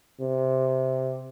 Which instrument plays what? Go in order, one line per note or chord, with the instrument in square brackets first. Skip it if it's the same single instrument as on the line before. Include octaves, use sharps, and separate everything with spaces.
[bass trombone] C3